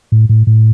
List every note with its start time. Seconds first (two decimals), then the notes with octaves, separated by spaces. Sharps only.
0.12 A2
0.29 A2
0.47 A2